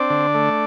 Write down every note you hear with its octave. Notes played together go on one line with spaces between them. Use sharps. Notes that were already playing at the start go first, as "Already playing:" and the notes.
Already playing: C4 D4 D5
D3
A3